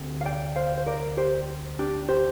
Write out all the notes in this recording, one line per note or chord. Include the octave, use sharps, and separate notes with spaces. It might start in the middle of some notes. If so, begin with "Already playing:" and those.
Already playing: D2 C3
F5
D5 G5
C5 F5
C5
A#4 D5
G4 C5
D4 G4
G4 C5